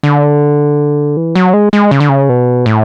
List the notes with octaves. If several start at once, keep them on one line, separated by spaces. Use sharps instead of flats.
D3
E3
F#3
G#3
G#3
C#3
D3
C#3
B2
A2